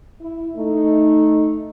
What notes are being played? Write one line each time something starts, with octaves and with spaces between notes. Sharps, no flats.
E4
A3 D#4